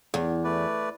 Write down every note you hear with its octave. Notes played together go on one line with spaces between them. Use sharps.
E2
A3 B4 D5